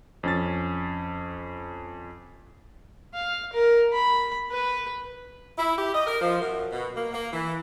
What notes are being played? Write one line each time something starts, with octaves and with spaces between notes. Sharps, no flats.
F2 C#4 A6
F5
A#4
B5
B4
E4
G4
D#5
A#4
F3
F#2
B2
A#3
A#3
E3